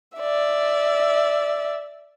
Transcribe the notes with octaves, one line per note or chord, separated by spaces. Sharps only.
D5 E5